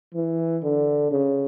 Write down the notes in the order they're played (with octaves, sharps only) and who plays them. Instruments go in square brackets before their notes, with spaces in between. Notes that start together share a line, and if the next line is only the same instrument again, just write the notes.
[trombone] E3
D3
C#3